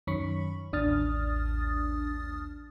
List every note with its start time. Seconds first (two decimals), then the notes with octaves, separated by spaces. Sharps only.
0.07 F#2 D#3 C#4 B5 C#6
0.73 A1 D#2 D4 D#6 F6 A6